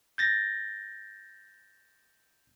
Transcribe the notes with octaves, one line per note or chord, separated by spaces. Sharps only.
G6 A6 A#6